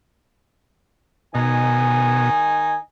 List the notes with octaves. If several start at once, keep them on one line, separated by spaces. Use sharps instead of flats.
B2 D#3 D#4 G#5